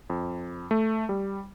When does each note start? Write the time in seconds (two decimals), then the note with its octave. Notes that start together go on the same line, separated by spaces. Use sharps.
0.10 F2
0.71 A3
1.09 G3